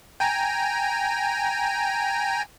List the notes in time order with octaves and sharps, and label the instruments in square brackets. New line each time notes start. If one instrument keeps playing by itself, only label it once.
[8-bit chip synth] G5 G#5 A#5